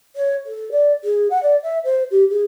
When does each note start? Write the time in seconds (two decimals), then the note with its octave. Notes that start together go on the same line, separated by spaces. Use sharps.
0.16 C#5
0.47 A4
0.72 D5
1.04 G#4
1.30 F#5
1.43 D5
1.63 E5
1.84 C5
2.11 G4
2.30 G#4